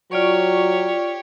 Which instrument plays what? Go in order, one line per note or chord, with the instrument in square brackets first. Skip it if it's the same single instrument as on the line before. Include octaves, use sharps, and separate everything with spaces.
[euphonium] F#3 [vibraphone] F4 D5 C#6 [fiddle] G4 C#5